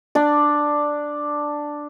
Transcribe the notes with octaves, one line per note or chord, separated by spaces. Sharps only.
D4 D5